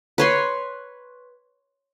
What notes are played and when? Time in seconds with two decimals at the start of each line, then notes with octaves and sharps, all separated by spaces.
0.18 B4 C#5 C6